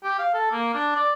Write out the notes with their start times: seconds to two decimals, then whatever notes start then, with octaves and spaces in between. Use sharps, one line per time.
0.04 G4
0.19 F5
0.34 A4
0.51 A#3
0.74 D4
0.96 D5